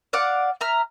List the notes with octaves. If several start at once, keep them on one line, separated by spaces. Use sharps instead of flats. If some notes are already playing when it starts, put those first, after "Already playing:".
D5 F5 F#5 D6
E5 A#5 F6